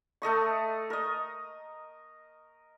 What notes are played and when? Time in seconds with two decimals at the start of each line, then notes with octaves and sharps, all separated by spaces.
0.22 A3 A4 D#5 C#6
0.90 A#4 D#5